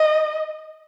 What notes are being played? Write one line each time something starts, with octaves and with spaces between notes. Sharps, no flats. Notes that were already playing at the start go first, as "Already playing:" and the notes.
Already playing: D#5